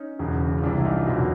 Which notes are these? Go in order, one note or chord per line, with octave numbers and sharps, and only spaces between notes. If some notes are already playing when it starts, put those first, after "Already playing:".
Already playing: C#4 D#4
E1 E2 C#3
F4
C2 C3 E3 D4 E4
E4
D#4 F4
F#1 E2 B2